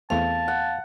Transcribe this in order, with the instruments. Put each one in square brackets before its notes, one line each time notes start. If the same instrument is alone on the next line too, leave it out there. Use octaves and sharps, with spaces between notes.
[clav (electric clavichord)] E2 A3 C4 [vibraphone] F5 [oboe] A5
[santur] F#5